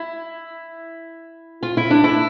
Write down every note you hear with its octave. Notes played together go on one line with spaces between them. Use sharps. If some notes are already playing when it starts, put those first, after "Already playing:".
Already playing: E4
F4
E4
D4
E4